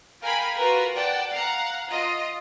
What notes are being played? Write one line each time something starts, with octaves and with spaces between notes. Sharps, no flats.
A#4 F5 G5 G#5 B5
F4 F#4 A#4 B4
D5 F#5 G5 A5
F5 F#5 A#5
F4 D#5